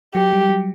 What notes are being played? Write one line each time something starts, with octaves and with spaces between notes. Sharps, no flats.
F#3 G4
G3
F#3